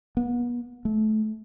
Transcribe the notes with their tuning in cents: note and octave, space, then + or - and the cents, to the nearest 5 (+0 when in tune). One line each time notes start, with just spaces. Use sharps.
B3 -35
A3 -25